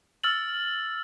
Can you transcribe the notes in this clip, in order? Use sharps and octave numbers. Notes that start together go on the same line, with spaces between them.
E6 F6 A6 F#7